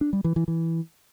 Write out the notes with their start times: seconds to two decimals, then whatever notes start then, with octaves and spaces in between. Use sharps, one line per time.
0.01 D4
0.13 G3
0.24 E3
0.36 E3
0.48 E3